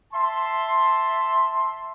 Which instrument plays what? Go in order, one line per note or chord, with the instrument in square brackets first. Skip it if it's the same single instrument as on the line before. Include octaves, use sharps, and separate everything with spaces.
[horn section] E5 A5 C6